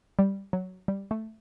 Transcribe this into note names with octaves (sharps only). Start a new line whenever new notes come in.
G3
F#3
G3
A3